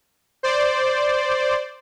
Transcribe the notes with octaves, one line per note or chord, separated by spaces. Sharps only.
C5 D5